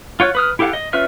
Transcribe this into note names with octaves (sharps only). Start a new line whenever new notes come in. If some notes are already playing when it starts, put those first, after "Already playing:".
F4 C#5 F#5
B4 D#6 F6
E4 G4 A4 F5 F#5
D#5
C#4 F4 B4 E5 F6